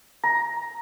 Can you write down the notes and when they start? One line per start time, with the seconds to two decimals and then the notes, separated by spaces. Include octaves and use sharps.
0.24 A#5